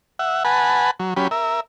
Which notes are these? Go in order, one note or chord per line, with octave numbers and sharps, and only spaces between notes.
E5 F#5
B4 F#5 G#5 A5 B5
F#3
F#3 C#4 G4 B5
A#4 E5